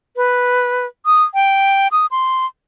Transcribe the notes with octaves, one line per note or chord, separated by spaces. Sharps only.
B4
D#6
G5
D#6
C6